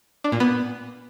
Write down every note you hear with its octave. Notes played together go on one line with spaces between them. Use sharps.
D4
A#2
B3